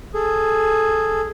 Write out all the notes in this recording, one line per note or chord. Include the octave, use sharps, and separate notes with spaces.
G#4 A4